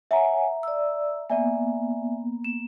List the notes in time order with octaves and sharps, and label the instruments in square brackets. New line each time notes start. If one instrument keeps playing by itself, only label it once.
[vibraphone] C#5 F#5 G#5 [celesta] E5 A#5
[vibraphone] D5 E6
[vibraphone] A#3 B3 [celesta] D5 E5 G#5
[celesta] E7